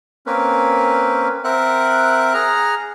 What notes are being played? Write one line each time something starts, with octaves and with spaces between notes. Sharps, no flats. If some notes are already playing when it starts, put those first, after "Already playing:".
A#3 C4 C#4 A#4 B4
C4 A#4 E5 F#5 F#6
G#4 F#5 A#5 F6